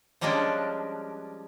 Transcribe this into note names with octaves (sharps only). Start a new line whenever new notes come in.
F3 G3 G#3 A#3 C#4 D4